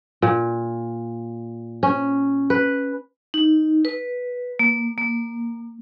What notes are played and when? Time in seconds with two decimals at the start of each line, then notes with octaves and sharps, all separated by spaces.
0.22 A#2
1.83 C#4
2.50 B4
3.34 D#4
3.85 B4
4.59 A#3
4.98 A#3